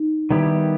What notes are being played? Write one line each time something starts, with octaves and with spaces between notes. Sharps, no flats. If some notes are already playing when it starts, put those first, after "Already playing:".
Already playing: D#4
D#3 G3 B3 E4 G4